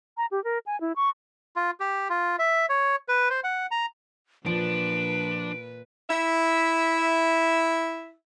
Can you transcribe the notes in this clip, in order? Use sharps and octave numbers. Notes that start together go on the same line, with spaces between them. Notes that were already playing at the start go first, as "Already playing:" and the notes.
A#5
G4
A#4
G#5
E4
C#6
F4
G4
F4
E5
C#5
B4
C5
F#5
A#5
A#2 F3 D4 B4 D7
E4 E5